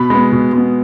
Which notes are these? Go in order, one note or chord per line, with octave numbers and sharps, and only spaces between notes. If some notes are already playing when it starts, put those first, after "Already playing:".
Already playing: B2 B5
G#3 B3
B2
G#3 B3